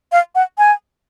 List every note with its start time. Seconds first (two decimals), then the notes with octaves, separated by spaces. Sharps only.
0.12 F5
0.35 F#5
0.58 G#5